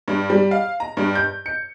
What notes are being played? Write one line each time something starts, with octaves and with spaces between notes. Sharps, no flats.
G2
G3
F5
A#5
G2
G6
C#7